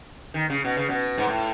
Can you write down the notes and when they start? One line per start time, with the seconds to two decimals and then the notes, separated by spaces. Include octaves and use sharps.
0.34 D#3
0.50 C#3
0.65 B2
0.77 C#3
0.89 B2
1.18 G#2
1.27 A2